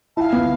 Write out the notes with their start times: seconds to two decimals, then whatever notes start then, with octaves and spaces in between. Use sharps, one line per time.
0.16 E4 F5 A5
0.33 B3